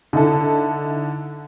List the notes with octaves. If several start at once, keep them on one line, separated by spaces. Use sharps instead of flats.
D3 D#4 E4 A4